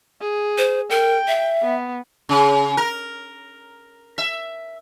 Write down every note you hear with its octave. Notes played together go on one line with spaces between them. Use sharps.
G#4
C5
A#4 G5
E5
B3
C#3
A#4
E5